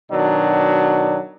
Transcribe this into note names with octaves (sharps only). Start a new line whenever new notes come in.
B2 D#3 F#3 D4